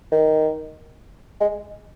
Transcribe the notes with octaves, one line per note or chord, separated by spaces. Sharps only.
D#3
G#3